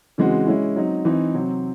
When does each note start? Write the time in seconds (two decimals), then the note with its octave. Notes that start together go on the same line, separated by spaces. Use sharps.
0.18 C#3 E3 G#3 C4 F#4
0.47 G#3 C#4 E4
0.76 F#3 C4 D#4
1.05 E3 C4 D#4
1.34 C3 F#3 C4